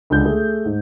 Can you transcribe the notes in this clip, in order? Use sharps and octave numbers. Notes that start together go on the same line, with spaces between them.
C#2 D3 D4 G6
A3 G#4
G#2